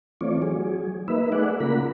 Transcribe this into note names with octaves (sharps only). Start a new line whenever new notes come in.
E3 A3 C4 F4 C#5 D5
F#3 G#4
A#3 D#4 B4 E5
A3 G#4 D5 F#5
C#3 A#3 F4 A#4 F#5 B5